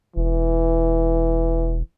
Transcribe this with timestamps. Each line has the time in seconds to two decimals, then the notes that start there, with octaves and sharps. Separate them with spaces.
0.16 E1 E3